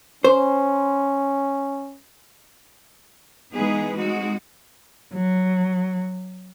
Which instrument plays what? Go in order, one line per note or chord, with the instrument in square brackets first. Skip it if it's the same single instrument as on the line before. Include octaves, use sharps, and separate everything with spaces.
[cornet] C#4 [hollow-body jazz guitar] C5
[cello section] E3 G#3 B3 D#4 G#4 B4
G#3 C4 D#4 F#4
[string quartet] F#3